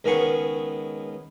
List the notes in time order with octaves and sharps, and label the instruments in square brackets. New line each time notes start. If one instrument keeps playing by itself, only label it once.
[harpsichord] C#2 D#3 B3 G#4 C#6